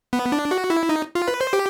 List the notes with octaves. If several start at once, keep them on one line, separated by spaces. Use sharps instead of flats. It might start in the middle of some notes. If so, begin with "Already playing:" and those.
B3
D4
F#4
E4
D#4
F4
B4
C5
G4